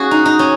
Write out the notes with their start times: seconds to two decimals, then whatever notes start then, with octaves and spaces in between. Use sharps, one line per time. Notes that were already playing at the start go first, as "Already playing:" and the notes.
Already playing: C#4 F#4 G#4
0.11 D#4
0.26 D#4
0.39 C#4